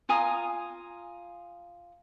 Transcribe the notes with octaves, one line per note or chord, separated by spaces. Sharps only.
F4 G#5 A#5 D#6